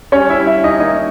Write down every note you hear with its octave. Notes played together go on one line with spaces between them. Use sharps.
G3 C#4 C#5
E4 E5
G3
E4 E5
C#4
D#4 D#5
A#3 D#4 D#5